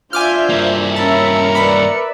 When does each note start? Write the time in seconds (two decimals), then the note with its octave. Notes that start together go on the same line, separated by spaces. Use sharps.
0.13 D4 F4 C5 E5 G#5 D6 F6 G6
0.50 G2 A#3
0.96 C#4 A#4 E5 A5 B5 C#7
1.55 B4 D5 E5 B5